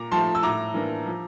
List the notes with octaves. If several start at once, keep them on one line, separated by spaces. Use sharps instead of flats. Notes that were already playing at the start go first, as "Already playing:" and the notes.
Already playing: A#2 A#5 D6
F3 A3 A5 C6
E6
A2 A#5 D6
E3 A#3 D4
F3